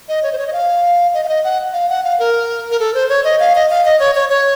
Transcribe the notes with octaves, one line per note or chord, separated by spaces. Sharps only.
D#5
C#5
C5
C#5
D#5
F5
D#5
F5
D#5
F#5
F5
F#5
F5
A#4
A#4
A4
C5
C#5
D#5
F5
D#5
F5
D#5
C#5
C#5
C#5